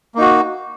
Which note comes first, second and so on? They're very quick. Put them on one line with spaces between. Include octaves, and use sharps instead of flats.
A#3 D#4 F#4